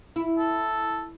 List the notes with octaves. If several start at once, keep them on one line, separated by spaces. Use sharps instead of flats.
E4
A4